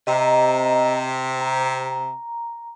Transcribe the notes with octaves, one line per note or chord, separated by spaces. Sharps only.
C3 D#5 A#5
A#5